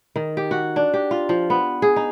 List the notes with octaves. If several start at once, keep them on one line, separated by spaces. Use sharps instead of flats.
D#3
G4
F#4
D4
G4
F4
F3
B3
G#4
D#4